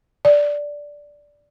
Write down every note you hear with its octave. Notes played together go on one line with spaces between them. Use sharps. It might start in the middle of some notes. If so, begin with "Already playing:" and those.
D5